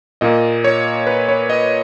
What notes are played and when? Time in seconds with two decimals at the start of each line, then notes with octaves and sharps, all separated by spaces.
0.21 A#2 A#3 D#5
0.64 C#5
1.07 B4
1.28 C#5
1.50 D#5